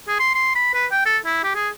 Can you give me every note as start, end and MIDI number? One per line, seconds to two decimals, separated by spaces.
0.08 0.16 68
0.20 0.34 84
0.35 0.54 84
0.55 0.73 83
0.74 0.86 71
0.92 1.02 79
1.05 1.18 69
1.25 1.41 64
1.43 1.51 67
1.55 1.69 68